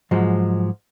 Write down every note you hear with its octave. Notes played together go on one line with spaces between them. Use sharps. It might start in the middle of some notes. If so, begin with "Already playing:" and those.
G#2 F3 F#3 G#3